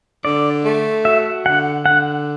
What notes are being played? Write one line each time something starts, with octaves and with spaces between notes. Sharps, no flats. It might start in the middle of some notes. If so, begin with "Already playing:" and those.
D3 D5
A3
F#4 E5
D3 F#5
D3 F#5